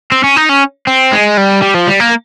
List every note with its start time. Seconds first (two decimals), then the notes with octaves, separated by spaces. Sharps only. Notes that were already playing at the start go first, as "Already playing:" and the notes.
0.12 C4
0.24 C#4
0.36 D#4
0.49 C#4
0.87 C4
1.12 G#3
1.37 G3
1.62 G3
1.75 F3
1.87 G3
2.00 A#3